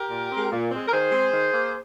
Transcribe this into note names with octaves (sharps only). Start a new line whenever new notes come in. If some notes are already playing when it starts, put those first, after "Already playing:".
Already playing: G4 A#4
A#2
G#3 C4
A#2
G#3 C4
A#4
D#3 G#4 C5
G#3 C4
D#3
A#3